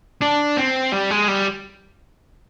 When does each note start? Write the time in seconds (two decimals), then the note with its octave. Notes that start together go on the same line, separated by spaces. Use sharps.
0.22 D4
0.57 C4
0.92 G3
1.10 G#3
1.28 G3